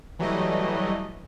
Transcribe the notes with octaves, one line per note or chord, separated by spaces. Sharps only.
E3 F#3 G3 A3 D#5